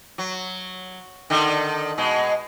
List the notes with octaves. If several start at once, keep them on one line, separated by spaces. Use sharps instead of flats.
F#3
D3 D#3
B2 G#3